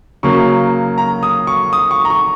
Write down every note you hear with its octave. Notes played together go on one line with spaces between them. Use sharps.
C#3 F#3 A#3 C#6
A#5
D#6
C#6
D#6
C#6
A#5
C#6